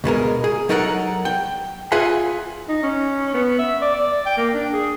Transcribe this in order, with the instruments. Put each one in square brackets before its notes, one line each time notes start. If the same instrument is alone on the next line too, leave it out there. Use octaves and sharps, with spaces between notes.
[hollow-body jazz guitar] D2 B2 G#3 A#4
G#4
F#3 D#4 A4 A#4 F5 F#5
G5
F4 G#4 E5 F#5 G#5
[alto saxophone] D#4
C#4
B3
E5
D5
D5
G5
A#3
D4
G#4